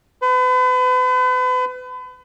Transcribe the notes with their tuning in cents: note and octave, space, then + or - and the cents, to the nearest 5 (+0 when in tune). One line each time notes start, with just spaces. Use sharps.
B4 +40